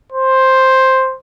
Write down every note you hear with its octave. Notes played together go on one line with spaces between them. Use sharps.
C5